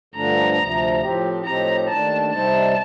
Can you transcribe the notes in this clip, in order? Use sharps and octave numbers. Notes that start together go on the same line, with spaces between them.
G2 D3 F3 A3 D4 A#5
D2 C3 F3
A2 F3 C4 G4
A2 F3 C4 D#4 G4 A#5
D#2 D#3 A3 D4 A5
C3 G3 C4 D#4 A5